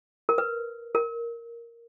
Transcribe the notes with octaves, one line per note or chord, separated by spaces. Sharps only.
A#4
B4
A#4